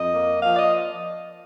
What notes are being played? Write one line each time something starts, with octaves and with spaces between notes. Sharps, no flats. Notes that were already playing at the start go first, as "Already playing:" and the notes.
Already playing: F2 D#5
A#3
F3 F5
D5
D#5